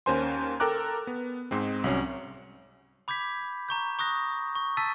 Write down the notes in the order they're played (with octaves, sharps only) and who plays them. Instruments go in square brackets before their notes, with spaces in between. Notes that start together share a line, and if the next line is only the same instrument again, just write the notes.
[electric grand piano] D#2 C#4 A#4 C5 G#5 C6
A4 A#4 G5 A#5 D6 F#6
B3
G#2 G#3 C4
C2 F#3 C#4
[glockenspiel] B5 D6 G6 G#6 B6
A#5 C#6 G6
C#6 D#6 F#6 A#6
C#6
A5 E6 A6 B6 D#7